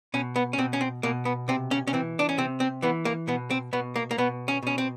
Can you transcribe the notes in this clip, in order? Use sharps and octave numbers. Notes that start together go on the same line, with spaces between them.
B2 C#4
B3
C#4
B2 C4
C#4
C4
B2 A#3
B3
C3 C4
C#4
C#4
E3 C4
D4
C#4
C3 C4
C4
E3 B3
A#3
B2 B3
C4
B2 B3
A#3
A#3
B2 B3
C#4
B2 C#4
C4